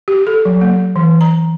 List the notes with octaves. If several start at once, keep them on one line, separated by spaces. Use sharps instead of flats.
G4
A4
F#3
A#3
E3
A#5